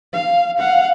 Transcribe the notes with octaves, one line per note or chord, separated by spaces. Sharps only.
F5
F5 F#5